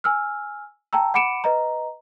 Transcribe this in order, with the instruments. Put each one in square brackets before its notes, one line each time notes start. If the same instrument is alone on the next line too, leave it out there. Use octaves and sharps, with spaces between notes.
[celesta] G#5 E6 F6
G5 A5 A#5 E6
F#5 B5 D6 C#7 D7 E7
B4 D#5 A#5